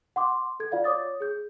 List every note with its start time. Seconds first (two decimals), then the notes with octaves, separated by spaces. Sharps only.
0.16 F#5 C6 D6
0.60 A4 G#6
0.71 F4 D5 F5 F#5
0.84 C#5 D6 D#6 A6
1.20 G#4 G6